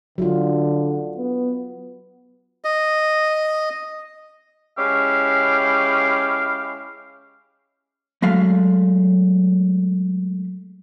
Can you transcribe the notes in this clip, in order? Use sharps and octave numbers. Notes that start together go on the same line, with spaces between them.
D3 F#3 E4 F4
B3
D#5
G#3 C#4 E4 G4 F5
F#3 G#3 A3 F5